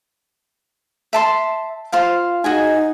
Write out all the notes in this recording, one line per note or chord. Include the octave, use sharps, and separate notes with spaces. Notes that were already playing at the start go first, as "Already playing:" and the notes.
E5 A5 C6
F4 C5 F5
D#4 F#4 G#4 G#5